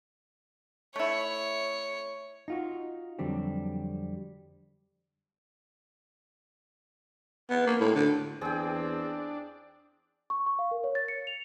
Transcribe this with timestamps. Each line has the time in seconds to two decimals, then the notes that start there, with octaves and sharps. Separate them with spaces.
0.96 A3 E4 C#5
2.48 D#4 F4 F#4
3.19 F2 D3 F#3 G3 C4
7.50 B3
7.67 A#3
7.80 A2
7.95 D3
8.41 E2 C4 D4 G#4 G5
10.30 C#6
10.46 C#6
10.59 F5
10.71 A#4
10.84 C#5
10.95 A6
11.08 C#7
11.27 F7